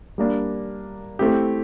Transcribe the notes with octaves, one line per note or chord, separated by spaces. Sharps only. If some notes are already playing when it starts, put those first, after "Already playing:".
G3 A#3 D4
A3 C4 E4 G4